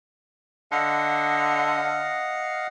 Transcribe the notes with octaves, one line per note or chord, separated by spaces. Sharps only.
D3 D#5 F5 F#5